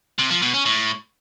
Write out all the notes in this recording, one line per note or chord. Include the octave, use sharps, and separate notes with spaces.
C3
F3
B2
C#4
A2